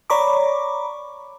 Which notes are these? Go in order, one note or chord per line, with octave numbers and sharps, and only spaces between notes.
C#5 D5 A#5 B5 C#6 D6